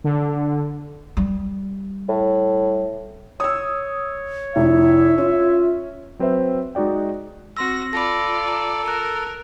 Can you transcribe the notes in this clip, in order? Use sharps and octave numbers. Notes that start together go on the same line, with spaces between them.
D3
G3
A2
C#5 D#6 E6
F1 E4 E5
C#4 F4
F#3 C4 B4 C5 E5
G#3 D#4 F#4 D5 G5
C4 F#4 C6 E6 A#6
F4 A4 D5 B5 A#6
A#5
A#4 A5 A#5 F#6